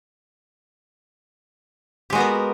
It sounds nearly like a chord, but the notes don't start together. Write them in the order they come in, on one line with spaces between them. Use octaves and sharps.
G4 G#3 F#4 B3 A#4